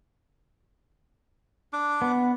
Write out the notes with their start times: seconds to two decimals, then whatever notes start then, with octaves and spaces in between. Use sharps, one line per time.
1.73 D4 D6
2.02 B3